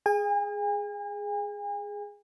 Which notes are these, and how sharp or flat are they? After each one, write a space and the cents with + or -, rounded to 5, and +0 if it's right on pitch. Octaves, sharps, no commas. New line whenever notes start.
G#4 +0 G#5 -40